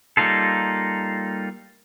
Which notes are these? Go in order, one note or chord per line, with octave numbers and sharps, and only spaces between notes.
G3 A#3 D#4 F4 A4